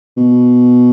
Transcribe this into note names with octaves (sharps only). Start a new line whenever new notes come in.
B2